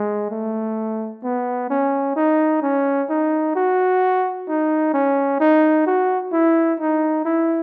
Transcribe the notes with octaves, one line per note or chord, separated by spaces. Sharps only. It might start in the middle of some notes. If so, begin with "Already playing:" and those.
Already playing: G#3
A3
B3
C#4
D#4
C#4
D#4
F#4
D#4
C#4
D#4
F#4
E4
D#4
E4